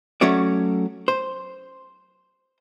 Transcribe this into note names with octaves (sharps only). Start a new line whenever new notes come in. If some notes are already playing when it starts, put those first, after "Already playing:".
F#3 A3 C#4 F#4 D5
C5